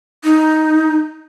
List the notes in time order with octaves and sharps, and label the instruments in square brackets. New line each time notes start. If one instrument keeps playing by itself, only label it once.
[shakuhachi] D#4